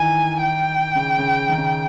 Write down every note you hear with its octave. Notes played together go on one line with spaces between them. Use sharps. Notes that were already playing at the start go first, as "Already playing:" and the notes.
Already playing: D#3 E3 G#5
G5
C#3
C#3
D#3
C#3